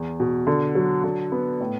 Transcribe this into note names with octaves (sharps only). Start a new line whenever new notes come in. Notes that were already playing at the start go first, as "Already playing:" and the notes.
Already playing: E2
B2
D3
F#3
D3
B3
A2